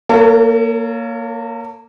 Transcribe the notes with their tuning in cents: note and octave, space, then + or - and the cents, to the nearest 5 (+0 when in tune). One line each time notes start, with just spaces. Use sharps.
A#3 +0 A4 +45 C#5 +15